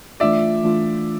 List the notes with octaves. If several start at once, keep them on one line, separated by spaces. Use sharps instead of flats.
E3 A3 D4 F4 D5 E5
E3 A3 D4 F4